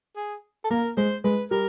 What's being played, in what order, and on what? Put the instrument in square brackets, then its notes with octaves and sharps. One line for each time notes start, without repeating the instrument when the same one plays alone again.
[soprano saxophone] G#4
A4
[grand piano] A#3 [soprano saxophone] A#4
[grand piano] G#3 [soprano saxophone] C5
[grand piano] G#3 [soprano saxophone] B4
[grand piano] G3 [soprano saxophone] A#4